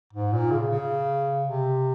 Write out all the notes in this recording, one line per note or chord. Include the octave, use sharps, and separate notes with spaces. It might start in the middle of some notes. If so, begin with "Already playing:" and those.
G#2
A#2
C#3
C#3
C3